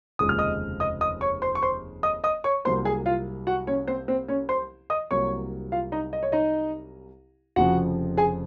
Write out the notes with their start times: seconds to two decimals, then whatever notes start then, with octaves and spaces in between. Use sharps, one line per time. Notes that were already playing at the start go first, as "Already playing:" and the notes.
0.19 F1 D#2 C#3 F3 G#3 D#6
0.29 F6
0.38 D#5 D#6
0.80 D#5 D#6
1.01 D#5 D#6
1.21 C#5 C#6
1.42 C5 C6
1.55 C#6
1.62 C5 C6
2.03 D#5 D#6
2.24 D#5 D#6
2.44 C#5 C#6
2.65 C2 C3 F#3 A#3 C5 C6
2.85 G#4 G#5
3.06 F4 F5
3.47 F#4 F#5
3.67 C#4 C#5
3.88 C4 C5
4.08 C4 C5
4.28 C#4 C#5
4.49 C5 C6
4.90 D#5 D#6
5.11 C2 C3 F#3 A#3 C#5 C#6
5.72 F4 F5
5.92 D#4 D#5
6.13 D#5
6.23 C#5
6.32 D#4 D#5
7.56 F1 F2 C#3 F3 F#4 F#5
8.17 G#4 G#5